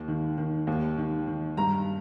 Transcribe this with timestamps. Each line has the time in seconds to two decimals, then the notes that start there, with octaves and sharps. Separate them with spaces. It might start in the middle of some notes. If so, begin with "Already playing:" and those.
Already playing: D#2
0.08 D#3
0.38 D#3
0.67 D#2
0.98 D#3
1.28 D#3
1.57 G2 A#5